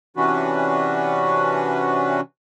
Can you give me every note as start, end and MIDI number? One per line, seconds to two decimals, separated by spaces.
0.17 2.21 48
0.17 2.21 52
0.17 2.21 61
0.17 2.21 62
0.17 2.21 66
0.17 2.21 71